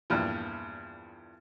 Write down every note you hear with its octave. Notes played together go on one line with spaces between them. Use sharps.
E2 G2 A#2 E3 F3